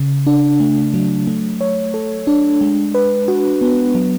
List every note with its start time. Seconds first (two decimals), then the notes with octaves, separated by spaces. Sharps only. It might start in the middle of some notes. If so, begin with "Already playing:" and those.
Already playing: C#3
0.27 D4
0.60 A3
0.94 F#3
1.27 A3
1.61 C#5
1.94 A4
2.27 D4
2.61 G#3
2.95 B4
3.28 F#4
3.61 B3
3.95 F#3